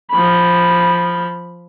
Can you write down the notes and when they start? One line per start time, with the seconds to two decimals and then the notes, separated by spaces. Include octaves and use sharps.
0.12 F3 B5